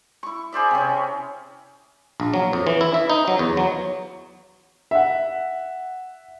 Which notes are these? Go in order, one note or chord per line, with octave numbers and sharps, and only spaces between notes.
E4 C#6
G#4 C5 D5 E5
C3 C#4
A#1
F#3
F2
E3
E4
E5
D#4
F#3
E2
F#3
E5 F#5